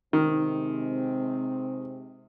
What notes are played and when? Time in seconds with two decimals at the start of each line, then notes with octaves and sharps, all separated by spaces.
0.13 C3 D#3 G#3 C4